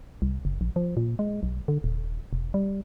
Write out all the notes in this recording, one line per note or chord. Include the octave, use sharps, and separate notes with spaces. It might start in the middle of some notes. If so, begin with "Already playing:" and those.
C2
F#1
A#1
F3
A#2
G#3
B1
D3
D#1
E1
G3